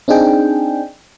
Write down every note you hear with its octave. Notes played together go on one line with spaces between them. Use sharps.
C4 D4 D#4 G#4 G5